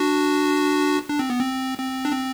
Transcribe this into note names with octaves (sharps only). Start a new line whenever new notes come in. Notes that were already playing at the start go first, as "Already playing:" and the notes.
Already playing: D4 F#4
D4
C4
B3
C4
C4
D4
C4